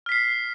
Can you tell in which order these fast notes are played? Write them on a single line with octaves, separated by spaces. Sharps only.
F6 B6 C7